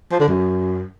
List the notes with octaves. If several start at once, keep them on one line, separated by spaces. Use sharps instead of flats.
F3
D3
F#2